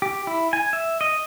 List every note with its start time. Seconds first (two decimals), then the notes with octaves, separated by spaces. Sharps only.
0.02 G4
0.27 E4
0.53 G#5
0.73 E5
1.01 D#5